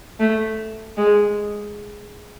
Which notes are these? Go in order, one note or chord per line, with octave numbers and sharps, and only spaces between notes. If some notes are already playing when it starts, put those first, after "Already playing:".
A3
G#3